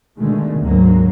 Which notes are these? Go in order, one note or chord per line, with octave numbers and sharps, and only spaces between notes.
B2 D3 D#3 G#3 A3
D2 G#2 F#3 A#3